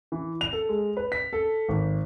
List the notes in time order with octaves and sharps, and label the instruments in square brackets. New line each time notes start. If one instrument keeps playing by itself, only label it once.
[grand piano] E3
F7
A4
G#3
B4
B6
A4
G#1